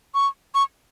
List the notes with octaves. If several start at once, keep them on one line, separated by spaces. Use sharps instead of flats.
C#6
C#6